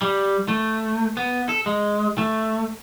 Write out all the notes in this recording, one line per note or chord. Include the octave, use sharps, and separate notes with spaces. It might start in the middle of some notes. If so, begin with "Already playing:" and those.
G3
A3
B3
A4
G#3
A3